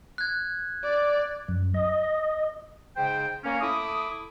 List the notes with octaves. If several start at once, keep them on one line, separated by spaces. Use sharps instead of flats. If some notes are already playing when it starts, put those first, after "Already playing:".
F#6 G#6
D5
F#2
D#5
G#2 C#3 C5 G5
A#3 C#4
A3 E4 D6 D#6